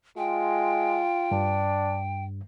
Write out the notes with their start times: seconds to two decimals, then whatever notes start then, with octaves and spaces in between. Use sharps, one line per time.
0.18 G#3 F4 G5
1.31 G2 D4